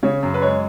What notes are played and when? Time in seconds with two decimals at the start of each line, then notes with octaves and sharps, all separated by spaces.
0.03 C#3 C#5
0.23 F#2
0.34 B4
0.42 G#3 C#5